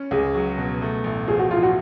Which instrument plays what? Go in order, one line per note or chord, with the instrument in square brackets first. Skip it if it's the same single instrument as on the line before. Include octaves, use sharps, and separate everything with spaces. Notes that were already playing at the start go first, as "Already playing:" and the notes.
Already playing: [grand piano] C#4
[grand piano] C#2 [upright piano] G#4
[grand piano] F#3
B2
A3
A1
[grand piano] F3 [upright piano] G#4
[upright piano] F#4
[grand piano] A2 [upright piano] F4
[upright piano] F#4